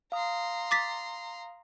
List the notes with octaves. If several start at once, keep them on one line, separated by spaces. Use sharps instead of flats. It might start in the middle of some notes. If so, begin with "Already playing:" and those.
F5 A#5 C6 D#6
D6 A6 B6